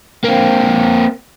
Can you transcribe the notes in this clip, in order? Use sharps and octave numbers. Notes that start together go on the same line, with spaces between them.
A#3 C4